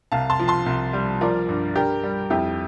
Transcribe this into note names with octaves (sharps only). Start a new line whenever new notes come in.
C2 F5 A5
A5 C6
F3
A5 C6
C2
G3
F3 A#4 D5
G2
G2 G4 A#4
G3
F2 E4 G4